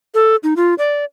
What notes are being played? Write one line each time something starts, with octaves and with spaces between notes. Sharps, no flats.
A4
D#4
F4
D5